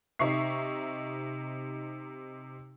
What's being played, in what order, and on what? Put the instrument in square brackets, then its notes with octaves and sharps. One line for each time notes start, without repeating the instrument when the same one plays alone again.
[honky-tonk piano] C3 D#4 E5 C#6 C7